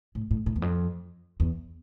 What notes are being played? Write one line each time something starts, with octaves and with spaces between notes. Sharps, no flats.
A2
A2
A2
E2
F2
E2